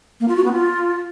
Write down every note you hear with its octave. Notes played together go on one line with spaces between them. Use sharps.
A#3
F4
F#4
B3
F4